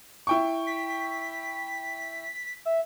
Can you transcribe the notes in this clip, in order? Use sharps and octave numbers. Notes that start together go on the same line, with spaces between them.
E4 G5 C#6
B6
E5